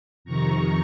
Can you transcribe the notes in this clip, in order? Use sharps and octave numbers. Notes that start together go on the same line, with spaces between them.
F2 C3 D#3 A#5 C#6